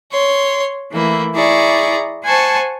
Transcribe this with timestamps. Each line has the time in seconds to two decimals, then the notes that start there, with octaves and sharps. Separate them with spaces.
0.12 C#5 C6
0.91 E3 A3 A#3 E4
1.34 E4 G#4 D5 A#5 C#6
2.23 C5 F#5 G#5 A5 C#6